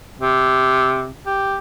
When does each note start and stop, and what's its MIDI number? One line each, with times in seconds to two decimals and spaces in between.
0.20 1.10 48
1.26 1.57 67